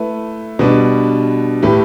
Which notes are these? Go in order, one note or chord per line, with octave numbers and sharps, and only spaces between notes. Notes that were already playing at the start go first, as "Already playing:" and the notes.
Already playing: A3 E4 B4
B2 G3 D4 B4
A2 A3 G4 B4